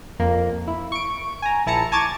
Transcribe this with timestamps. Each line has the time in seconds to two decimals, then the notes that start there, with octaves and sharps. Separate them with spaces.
0.19 F2 A#3
0.68 E4
0.92 C#6 D7
1.42 G#5 A#5
1.66 A#1 E4 A5 A#5 C#7
1.92 G#5 A5 C#6 D6 G#6 A6